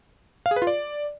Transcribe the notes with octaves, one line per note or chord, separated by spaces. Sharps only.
F5
G#4
B4
F4
D5